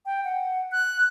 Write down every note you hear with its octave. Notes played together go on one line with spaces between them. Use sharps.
G5
F#5
F#6